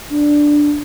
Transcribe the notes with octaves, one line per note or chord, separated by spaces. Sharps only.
D4